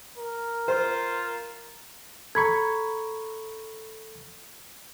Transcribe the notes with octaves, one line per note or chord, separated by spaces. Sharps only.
A#4
F4 C5
A4 A#5 B5 C#6 G#6